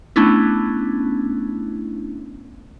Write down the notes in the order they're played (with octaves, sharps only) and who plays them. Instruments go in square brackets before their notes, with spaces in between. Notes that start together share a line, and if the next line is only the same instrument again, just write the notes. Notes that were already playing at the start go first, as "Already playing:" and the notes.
[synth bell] A3 B3 C#4 D4 E4